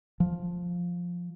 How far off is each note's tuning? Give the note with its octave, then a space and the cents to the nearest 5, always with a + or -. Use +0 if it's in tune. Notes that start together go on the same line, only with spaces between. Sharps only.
F3 +5